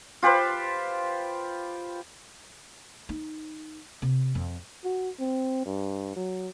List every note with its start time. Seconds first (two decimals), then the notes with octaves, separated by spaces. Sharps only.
0.22 F4 G4 B4 C5
3.09 D#4
4.02 C3
4.35 F2
4.85 F#4
5.20 C4
5.65 G2
6.16 F#3